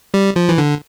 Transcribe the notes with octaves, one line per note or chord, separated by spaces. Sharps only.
G3
F3
E3
D3